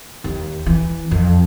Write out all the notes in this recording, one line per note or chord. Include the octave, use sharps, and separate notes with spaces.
D#2
E3
F2